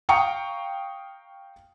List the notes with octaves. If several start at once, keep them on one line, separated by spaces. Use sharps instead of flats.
F5 G5 A#5 C#6 D#6 C#7